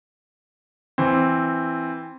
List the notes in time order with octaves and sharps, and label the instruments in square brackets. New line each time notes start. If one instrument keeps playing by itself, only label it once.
[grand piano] E3 C4